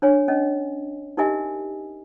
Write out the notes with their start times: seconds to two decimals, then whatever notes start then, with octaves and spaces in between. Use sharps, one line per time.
0.02 D4 C#5 G#5
0.28 C#4 D#5
1.17 D#4 G4 A#4 D#5 E5 G#5